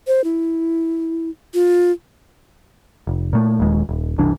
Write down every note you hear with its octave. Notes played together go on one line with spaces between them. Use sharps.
C5
E4
F4
F1
A#2 A3
D#1 D#2 G#3
D#1
F#1 C2 E3 D4